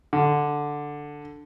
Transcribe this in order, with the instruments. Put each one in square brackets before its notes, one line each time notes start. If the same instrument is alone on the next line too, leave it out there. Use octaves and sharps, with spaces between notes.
[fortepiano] D3